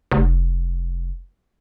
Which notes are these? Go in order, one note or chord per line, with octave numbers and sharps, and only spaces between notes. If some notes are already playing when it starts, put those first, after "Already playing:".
F1